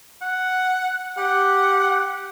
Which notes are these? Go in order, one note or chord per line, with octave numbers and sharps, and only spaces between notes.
F#5
G4 F#5